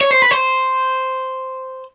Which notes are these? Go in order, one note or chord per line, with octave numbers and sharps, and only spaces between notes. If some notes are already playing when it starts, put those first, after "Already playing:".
C#5
C5
B4
C5